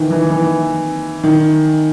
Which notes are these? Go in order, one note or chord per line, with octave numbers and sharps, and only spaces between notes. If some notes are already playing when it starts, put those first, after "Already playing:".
Already playing: D#3 E3
E3
E3
D#3